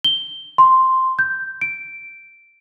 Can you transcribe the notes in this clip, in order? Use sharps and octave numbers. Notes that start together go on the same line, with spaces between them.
G7
C6
G6
D7